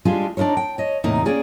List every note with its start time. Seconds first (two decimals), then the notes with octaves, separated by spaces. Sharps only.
0.05 G3 G#3 D4 F4 G#4
0.37 D4 D#4 F4 A#4 C#5
0.57 G5
0.78 C#5 D#5
1.04 E2 A2 C3 A#3 D#4
1.25 A#3 C#4 G#4 D5 G5